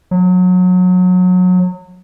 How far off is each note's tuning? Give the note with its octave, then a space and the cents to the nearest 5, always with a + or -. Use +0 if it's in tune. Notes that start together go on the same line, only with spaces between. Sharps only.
F#3 -25